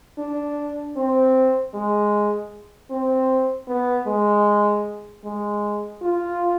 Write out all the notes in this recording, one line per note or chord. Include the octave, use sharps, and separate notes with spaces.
D4
C4
G#3
C4
B3
G#3
G#3
F4